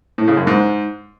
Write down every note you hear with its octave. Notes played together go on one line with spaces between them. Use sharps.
A2
C#3
F#2
G#2